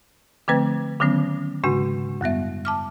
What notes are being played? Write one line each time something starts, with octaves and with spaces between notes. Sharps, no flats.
D3 F3 A3 C4 B4 G#6
D3 D#3 F#3 B3 C#4
G#2 C#3 G#3 D4 F#4
F#2 G3 B3 E5
A5 D6 F6